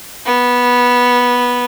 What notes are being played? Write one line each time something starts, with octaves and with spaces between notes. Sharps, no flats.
B3